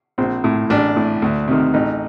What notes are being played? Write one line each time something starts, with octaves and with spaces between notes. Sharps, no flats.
A#1 C4
A2
A1 D4
A2
D2
C3 D#3
A1 D#4